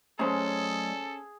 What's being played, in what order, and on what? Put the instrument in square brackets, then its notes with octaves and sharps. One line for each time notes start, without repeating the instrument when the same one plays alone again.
[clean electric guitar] F#3 A3 A#5 [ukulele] C#4 C5 [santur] G#4 [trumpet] A4